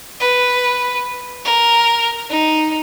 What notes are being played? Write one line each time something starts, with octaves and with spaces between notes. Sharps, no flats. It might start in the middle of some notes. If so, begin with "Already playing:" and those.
B4
A#4
D#4